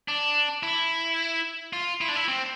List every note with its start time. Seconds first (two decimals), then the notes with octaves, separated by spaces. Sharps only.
0.08 D4
0.63 E4
1.73 F4
2.01 E4
2.09 D4
2.16 E4
2.28 C4